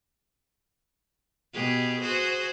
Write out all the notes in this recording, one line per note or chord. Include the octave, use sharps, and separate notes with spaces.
B2 G4 G#4
F#4 G#4 C5